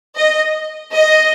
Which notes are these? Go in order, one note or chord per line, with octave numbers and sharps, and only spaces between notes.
D#5
D#5